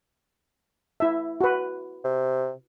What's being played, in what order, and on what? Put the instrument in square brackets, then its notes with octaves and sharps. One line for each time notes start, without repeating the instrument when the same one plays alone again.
[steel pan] E4 E5
F#4 B4
[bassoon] C3